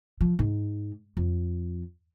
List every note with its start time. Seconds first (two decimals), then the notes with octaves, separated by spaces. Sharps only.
0.21 F3
0.39 G#2
1.17 F2